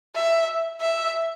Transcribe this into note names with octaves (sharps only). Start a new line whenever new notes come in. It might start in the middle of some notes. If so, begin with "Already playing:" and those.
E5
E5